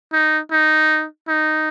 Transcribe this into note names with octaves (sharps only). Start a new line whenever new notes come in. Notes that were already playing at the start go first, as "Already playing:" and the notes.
D#4
D#4
D#4